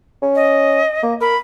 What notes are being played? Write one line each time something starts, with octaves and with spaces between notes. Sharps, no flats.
C#4
D#5
A#3
A#4 B5